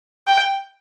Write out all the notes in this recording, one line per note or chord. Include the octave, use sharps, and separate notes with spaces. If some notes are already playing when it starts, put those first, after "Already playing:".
G5